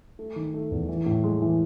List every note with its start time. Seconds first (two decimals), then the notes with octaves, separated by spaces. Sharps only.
0.19 A3
0.36 D#3
0.54 A3
0.71 E2
0.89 E3
1.06 A2
1.24 G#3
1.42 E3